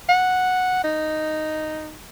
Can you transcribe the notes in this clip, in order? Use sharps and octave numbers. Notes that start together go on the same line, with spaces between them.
F#5
D#4